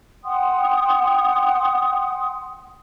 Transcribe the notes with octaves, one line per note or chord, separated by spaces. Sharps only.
F#5 G5 C6 D#6